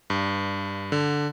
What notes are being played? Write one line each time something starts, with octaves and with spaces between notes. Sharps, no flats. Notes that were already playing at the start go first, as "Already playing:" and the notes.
G2
D3